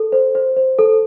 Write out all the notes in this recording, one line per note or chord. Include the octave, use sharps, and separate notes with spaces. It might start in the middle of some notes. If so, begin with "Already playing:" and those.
Already playing: A4
C5
C5
C5
A4